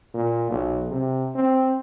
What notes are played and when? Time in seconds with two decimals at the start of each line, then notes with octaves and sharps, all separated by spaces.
0.14 A#2
0.50 B1
0.91 C3
1.35 C4